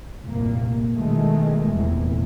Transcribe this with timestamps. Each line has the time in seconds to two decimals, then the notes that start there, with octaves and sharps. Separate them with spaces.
0.24 F1 C2 G2 A#2 A#3
0.94 B2 D#3 E3 G#3 A3
1.71 F1 E2 A#2 E3